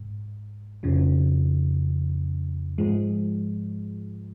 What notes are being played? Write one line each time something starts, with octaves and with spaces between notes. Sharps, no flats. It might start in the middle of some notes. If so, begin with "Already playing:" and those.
Already playing: G#2
F2 C#3 F3
G#2 F3 G#3